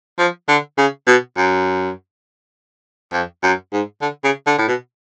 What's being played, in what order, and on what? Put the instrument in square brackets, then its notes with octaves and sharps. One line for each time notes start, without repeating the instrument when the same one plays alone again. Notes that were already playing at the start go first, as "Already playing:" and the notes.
[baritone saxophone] F3
D3
C#3
B2
F#2
F2
F#2
G#2
D3
C#3
D3
A2
B2